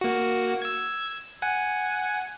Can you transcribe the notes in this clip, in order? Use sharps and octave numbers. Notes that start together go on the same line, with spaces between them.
A#3 F#4
E6 G#6
F#5 G#5